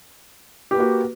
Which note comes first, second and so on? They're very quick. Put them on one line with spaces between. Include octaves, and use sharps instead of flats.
G4 B4 A#3 F#4